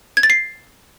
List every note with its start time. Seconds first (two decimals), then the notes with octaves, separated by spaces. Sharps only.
0.17 G#6
0.23 A6
0.30 C7